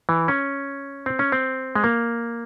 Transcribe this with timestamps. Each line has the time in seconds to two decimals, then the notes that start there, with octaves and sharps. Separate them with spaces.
0.09 E3
0.28 C#4
1.06 C4
1.19 C#4
1.32 C4
1.75 G#3
1.84 A#3